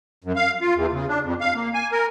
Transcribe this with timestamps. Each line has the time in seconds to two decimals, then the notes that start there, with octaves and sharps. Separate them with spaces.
0.24 F#2
0.36 F5
0.61 F4
0.75 E2
0.92 C#3
1.08 D4
1.23 F2
1.41 F5
1.55 A#3
1.74 G#5
1.92 A#4